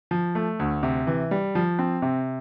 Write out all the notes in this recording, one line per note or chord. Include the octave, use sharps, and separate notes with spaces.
F3
A3
D2
C3
E3
G3
F3
C4
C3